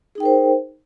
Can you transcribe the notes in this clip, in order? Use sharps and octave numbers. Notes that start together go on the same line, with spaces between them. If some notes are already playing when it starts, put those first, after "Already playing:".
D#4 G#4 A#4 C5 G5